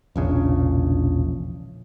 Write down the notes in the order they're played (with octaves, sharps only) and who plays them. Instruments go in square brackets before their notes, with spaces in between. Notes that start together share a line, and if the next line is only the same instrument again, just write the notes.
[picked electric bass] E1 A#1 C#3